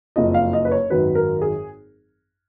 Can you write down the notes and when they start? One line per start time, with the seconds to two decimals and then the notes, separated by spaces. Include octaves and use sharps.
0.16 F#1 F2 F3 D#5
0.34 F5
0.53 D#5
0.65 B4
0.72 C#5
0.90 G#1 F#2 D#3 F#3 B4
1.15 A#4
1.42 G#4